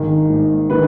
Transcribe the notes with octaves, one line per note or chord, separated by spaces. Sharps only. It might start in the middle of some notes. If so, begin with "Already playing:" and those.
Already playing: G#1 D#3 G#4
G#2
D#3 B4